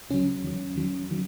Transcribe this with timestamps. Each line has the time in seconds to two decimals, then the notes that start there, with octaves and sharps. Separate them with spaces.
0.09 C#2 C#3 F#3 C#4
0.43 E2 D#3 F#3
0.75 E2 D#3 F#3
1.11 D#3 F#3